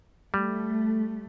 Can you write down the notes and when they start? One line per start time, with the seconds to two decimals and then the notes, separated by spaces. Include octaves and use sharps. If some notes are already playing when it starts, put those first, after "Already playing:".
0.34 G3 A3